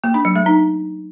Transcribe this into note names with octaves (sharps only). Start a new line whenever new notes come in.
A#3
D4
F#3
A3
D#4